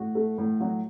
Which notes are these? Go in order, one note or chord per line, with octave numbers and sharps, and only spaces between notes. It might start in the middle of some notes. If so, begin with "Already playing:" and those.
Already playing: A2 F#4
A3
A2
F#3